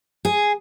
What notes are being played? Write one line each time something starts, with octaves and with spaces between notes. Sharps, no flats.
G#4